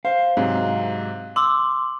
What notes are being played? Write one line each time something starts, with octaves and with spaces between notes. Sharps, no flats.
C5 F5
G#2 C3 F#3
C6 D6 E6 F#7